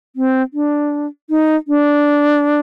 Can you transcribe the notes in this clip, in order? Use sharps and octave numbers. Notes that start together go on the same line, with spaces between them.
C4
D4
D#4
D4